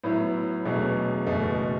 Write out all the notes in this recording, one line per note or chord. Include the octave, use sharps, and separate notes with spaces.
A2 F#3 B3 E4
E1 E2 B2 F#3 A3
F#1 E2 B2 A3